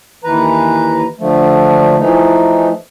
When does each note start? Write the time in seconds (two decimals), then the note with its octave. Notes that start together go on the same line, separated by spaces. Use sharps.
0.24 D#2 E3 B4 A#5
1.20 D3 F3 A3
1.99 E3 F3 A3 D#4